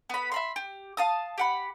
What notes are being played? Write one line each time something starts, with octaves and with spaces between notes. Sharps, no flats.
B3 B5
E5 B5 C6
G4
F5 A5 D#6
G4 F#5 B5